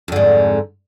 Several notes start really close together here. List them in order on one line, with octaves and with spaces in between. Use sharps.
F2 D3 G#2